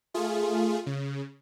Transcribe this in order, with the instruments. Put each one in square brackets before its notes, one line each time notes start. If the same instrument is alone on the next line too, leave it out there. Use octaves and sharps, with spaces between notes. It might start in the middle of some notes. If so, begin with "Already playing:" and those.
[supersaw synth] A3 F4 G#4
C#3